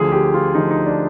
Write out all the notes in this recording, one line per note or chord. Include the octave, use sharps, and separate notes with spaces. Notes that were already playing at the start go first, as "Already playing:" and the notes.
Already playing: D2 D3 F3 G#4
G4
F4
D2 D3 F3 D#4
D#4
D4